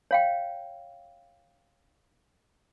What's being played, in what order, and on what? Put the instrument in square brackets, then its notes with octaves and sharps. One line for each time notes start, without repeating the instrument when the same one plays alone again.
[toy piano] C#5 F5 G5